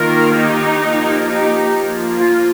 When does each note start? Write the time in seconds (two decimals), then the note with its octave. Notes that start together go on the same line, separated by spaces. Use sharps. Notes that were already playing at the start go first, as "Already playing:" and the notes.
Already playing: D#3 A#3 F4 A#4
0.36 D#4 G4
0.82 F3 A#3
1.27 D#4 G4
1.72 F3 A#3
2.16 F4